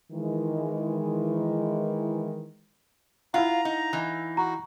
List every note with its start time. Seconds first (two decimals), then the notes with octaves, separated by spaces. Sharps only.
0.12 D#3 E3 G#3
3.34 E4 F4 F5 F#5 A#5
3.65 D#4
3.93 E3 D#4
4.37 F#4 A#5